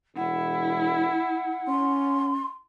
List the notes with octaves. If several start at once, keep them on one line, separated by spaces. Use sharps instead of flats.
E1 E4 F#5
C#4 C6